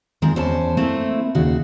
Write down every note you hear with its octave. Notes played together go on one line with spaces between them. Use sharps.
D#3 G#3 C4 F4
E2 C#4 C5 D5 A5
A3 A#3 C4 E4
D#2 C#3 F#4